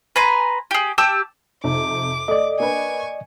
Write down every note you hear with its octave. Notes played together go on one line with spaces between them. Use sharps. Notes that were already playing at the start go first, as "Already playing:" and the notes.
B4 G#5 A#5 C6
G4 G#4
G4 A5 D6 E6
F2 C3 D#4 D6
A3 D5 D#5
A#3 D4 B4 G#5 C#6